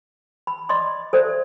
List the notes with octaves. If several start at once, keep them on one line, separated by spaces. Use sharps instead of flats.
B5
D5 D#5 B5 C6 D6
A4 C5 D5 E5